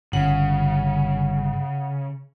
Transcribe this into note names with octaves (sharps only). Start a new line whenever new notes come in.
G1 C#3 F#5